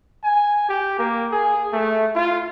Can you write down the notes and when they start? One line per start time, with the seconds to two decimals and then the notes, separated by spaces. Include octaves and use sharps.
0.24 G#5
0.69 G4
0.99 A#3
1.32 G#4
1.73 A3
2.15 F4